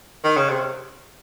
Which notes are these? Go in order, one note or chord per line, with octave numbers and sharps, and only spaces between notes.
D#3
C#3
C3